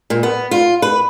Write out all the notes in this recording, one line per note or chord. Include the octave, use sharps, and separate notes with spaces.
A#2
B3
F4
B4